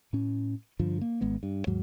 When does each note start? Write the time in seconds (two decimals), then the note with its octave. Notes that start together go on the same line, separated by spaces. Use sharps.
0.13 A2 C#4
0.79 G2 D3 F3
1.01 A#3
1.21 G#1 G#3 B3
1.43 G2
1.67 D#2 G#2 F#3